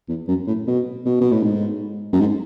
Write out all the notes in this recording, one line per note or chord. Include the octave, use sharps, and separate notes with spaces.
E2
F#2
A2
B2
B2
B2
A2
G#2
F#2
G#2